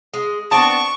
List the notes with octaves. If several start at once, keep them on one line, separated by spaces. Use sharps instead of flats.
G#3
B3 C4 D4 A5 C#6 D#6 D7